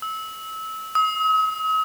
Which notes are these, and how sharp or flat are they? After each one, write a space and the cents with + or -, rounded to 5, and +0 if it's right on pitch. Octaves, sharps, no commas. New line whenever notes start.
E6 -25
D#6 +45